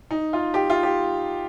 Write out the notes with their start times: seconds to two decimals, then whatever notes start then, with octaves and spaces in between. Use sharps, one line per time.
0.11 D#4
0.33 F4
0.54 G4
0.70 F4
0.83 G4